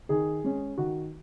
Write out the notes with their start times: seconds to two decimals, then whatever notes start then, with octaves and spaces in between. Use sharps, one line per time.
0.09 D#3 G#4
0.44 G#3 C#4
0.78 D#3 F#4